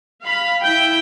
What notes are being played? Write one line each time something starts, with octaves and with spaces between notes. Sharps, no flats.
F5 B5
E4 G5